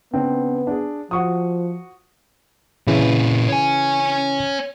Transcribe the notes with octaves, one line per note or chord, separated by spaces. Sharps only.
C#3 B3 C4 D4
D4 G#4
F3 F#4 C#6 D#6
A#2 C#3 E3 B4
C#5 G#5